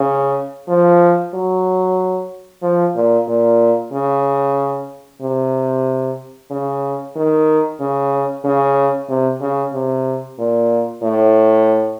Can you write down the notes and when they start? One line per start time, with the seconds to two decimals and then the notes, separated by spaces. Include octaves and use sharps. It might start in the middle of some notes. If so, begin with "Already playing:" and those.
Already playing: C#3
0.68 F3
1.34 F#3
2.62 F3
2.95 A#2
3.28 A#2
3.92 C#3
5.22 C3
6.50 C#3
7.16 D#3
7.80 C#3
8.44 C#3
9.09 C3
9.41 C#3
9.73 C3
10.38 A#2
11.03 A2